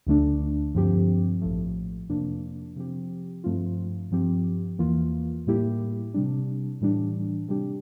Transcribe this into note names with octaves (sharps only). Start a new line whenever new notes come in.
D2 D3 A3 D4
G2 D3 F3 C4 G4
A#1 A2 F3 A3
F2 C3 F3 A#3 D4
C3 F3 C4 G4
G2 F3 A3 C4 F4
G2 F3 C4 G4
E2 E3 A#3 F4
A2 G3 A#3 E4 G4
C3 G3 D4
A2 E3 G3 D4
C3 G3 D4 G4